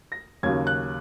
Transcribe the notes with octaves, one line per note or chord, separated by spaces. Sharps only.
A#6
D#2 C#3 F#3 G#6
F#6